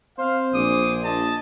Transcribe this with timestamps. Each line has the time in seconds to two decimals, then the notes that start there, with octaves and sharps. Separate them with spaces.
0.18 C4 C5 F5
0.54 A#1 G#4 D6 D#6
1.03 D#5 A5